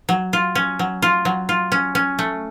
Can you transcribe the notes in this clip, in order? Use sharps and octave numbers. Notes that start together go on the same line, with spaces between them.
F#3
F4
C#4
F#3
F4
F#3
F4
C#4
C#4
A3